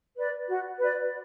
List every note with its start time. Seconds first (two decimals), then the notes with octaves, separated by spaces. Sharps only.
0.16 B4 D5
0.47 F#4
0.78 B4 D5